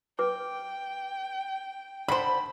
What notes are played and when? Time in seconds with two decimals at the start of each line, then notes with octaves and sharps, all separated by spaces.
0.19 B4 G5 D6
2.08 D3 C5 B5